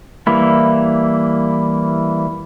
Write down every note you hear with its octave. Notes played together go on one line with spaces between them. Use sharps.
E3 G3 A#3 E4